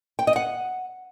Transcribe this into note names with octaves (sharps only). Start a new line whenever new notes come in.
G5
D#5
F#5